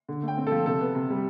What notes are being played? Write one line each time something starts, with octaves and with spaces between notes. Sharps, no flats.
D3
A3 G5
C4
A4
F3
C3 A4
B3
C3
G3